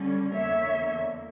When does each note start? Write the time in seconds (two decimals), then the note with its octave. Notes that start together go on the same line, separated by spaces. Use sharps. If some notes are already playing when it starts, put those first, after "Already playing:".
Already playing: D3 G3 C#4
0.34 E2 D3 A#3 C#5 E5